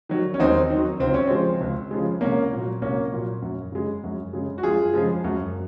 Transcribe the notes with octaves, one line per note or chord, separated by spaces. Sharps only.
D#3 F#3
C#4
D#2 C4 D#4
D#3 F#3
C#2 C4
C#4
C#3 F3 G#3 C4
C#2
C#3 F3 G#3
C2 A#3 C#4
A#2 F#3
C2 A#3 C#4
A#2 F#3
F#2
C#3 G#3
F#2
C#3 G#3
F#4
F#2 F4 G#4
C#3 F3 G#3
F#2